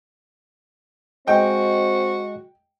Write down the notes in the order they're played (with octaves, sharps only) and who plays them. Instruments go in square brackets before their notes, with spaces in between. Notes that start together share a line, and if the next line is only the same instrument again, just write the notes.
[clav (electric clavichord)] G#3 D#5 [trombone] C4 [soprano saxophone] F#4 [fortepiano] G5